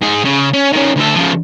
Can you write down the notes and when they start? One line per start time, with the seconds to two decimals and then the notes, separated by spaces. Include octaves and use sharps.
0.03 G#2 G#4
0.25 C#3
0.53 C#4
0.72 D#3 C#4
0.96 D2 A4
1.15 C#3 F3